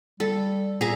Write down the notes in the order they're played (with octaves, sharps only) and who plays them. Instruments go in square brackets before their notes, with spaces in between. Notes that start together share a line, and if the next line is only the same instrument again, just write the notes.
[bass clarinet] G3 [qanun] A4
[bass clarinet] A#2 [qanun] G#4 E5 A#5